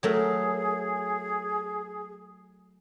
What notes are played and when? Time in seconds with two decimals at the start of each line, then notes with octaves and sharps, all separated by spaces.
0.03 F#3 A3 G#4 A#4